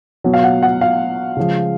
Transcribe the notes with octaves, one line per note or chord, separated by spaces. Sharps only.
B2 F#3
F5
F#5
F#5
F5
C#3 F3 G#3